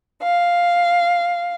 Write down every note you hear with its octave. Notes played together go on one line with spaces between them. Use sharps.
F5